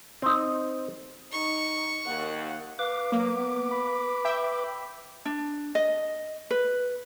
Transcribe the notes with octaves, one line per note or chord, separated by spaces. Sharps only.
C4 D#4
D#4 C#6
D#2 F#5
B4 F5 D6
F#3 A#3
B3
B5
E5 G5
D4
D#5
B4